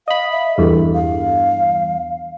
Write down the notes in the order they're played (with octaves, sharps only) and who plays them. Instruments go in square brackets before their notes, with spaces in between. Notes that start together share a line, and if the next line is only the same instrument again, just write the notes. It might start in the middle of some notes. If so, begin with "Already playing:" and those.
[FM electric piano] D#5 B5 [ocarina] F5
[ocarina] E5
[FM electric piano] E2 G2 [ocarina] A4
[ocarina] F5